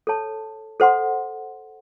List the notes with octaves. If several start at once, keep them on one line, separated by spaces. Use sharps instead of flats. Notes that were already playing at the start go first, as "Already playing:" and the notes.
A4 C#5 A5
A4 C5 F#5 C6